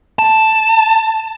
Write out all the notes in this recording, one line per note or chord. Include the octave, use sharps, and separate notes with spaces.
A5